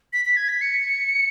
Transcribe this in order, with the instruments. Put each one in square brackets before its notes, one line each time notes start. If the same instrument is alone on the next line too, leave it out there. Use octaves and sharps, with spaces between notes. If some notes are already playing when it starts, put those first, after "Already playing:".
[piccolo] B6
B6
G#6
B6
C#7